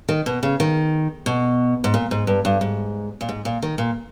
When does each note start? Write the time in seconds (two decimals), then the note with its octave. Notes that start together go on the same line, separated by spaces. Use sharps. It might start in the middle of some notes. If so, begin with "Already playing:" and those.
0.09 D#3
0.26 B2
0.43 C#3
0.60 D#3
1.26 B2
1.84 G#2
1.94 A#2
2.11 G#2
2.27 G2
2.45 G2
2.61 G#2
3.21 A#2
3.29 G#2
3.45 A#2
3.62 D#3
3.78 A#2